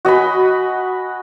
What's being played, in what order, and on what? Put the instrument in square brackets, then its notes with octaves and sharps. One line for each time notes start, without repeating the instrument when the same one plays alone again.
[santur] F#4 D#5 G#5 B5